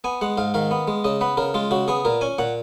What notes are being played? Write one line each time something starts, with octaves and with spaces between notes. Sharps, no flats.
B3 G#5
G#3 F#5
G#2 F5
D#3 F5
B3
G#3
C#3 D#5
B3 B4
C#3 A#4
G#3 F4
C#3 F#4
B3 G#4
A#2 A#4
C#4 G#5
A#2 F#5